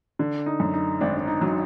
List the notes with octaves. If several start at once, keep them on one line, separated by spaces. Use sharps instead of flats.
D3
D#4
F#2
D#4
G#1 D4
D4
D#4
F#3
D#4